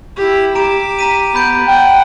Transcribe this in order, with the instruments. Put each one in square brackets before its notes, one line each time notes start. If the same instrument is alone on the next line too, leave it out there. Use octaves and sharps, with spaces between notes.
[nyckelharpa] E4 G4
[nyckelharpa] G4 D6 [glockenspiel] A#5 D7 E7
[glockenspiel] A#5 B6 D#7
[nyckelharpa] B3 [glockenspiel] B5 G6 D7
[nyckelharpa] F#5 [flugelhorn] G5